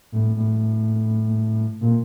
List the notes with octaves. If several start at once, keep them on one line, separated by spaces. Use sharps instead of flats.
A2
A2
A#2